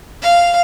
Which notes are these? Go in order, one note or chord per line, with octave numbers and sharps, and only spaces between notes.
F5